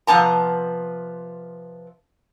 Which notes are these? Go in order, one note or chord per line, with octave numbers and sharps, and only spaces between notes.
C3 F3 B3 A5 A#5